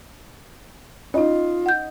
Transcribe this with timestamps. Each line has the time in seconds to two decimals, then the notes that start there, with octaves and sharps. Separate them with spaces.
1.14 C#4 D#4 F4 D#5
1.66 F#5 G6